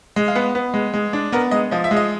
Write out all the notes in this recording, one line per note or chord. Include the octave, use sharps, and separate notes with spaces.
G#3
F5
B3 F#5
B3
G#3
G#3
D4
B3 A#4
G#3 D#5
F3 D#5
E5
G#3
D#5